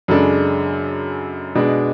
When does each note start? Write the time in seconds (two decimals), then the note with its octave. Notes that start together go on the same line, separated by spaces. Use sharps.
0.08 F#2 C#3 G#3 D4 A4
1.55 B2 G#3 D4